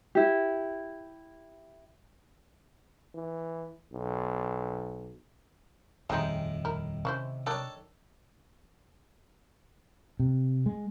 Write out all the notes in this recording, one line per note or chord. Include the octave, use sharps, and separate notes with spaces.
E4 G4
E3
B1
D#1 F2 A2 D#3 G3 G#3 C4 D#4
E4 A#4
C3 C#4 E4 C5
D#3 D4 A4 C#5
C3
G#3